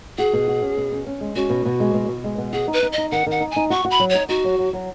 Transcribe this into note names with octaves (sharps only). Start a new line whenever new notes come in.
F#4 G#4
B2
F#4
C#4
B2
C#4
C#4
G#3
C#4 F#4
B2
B2
G#3
B2
B2
G#3
B2
F#4 G#4
D#4
B4
D#4
D#5
D#4
D#3 F#5
D#3 F#5
D#4
G#5
D#4
F#4 C#6
F#4
B5
F#3
D#4 C#5
D#4 F#4
F#3
F#3
F#3